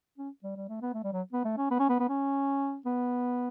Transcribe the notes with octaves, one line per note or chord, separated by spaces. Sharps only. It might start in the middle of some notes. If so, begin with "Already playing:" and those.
C#4
G3
G3
A3
B3
A3
G3
F#3
B3
A3
C#4
B3
C#4
B3
B3
C#4
B3